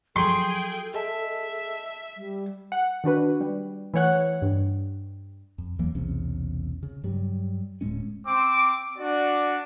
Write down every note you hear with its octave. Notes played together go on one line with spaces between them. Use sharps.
F3 F#3 G#4 A4 G5 C6
G#4 D#5 E5 A5
G3
F#5
D#3 D4 F#4 B4
G3
E3 A3 C#5 F#5 F#6
G2
F2
D#2 E3 F#3 A#3
B1 E2 C3 C#4
C#3
G2 F#3 G3
D1 A2 G#3 C#4
C4 D6
D4 F#4 D5